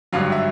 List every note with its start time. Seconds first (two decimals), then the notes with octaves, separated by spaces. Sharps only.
0.13 G#1 G2 D3 F#3 F5
0.32 E5